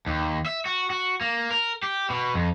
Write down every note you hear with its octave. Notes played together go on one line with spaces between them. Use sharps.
D#2
E5
F#4
F#4
A#3
A#4
G4
B2
F2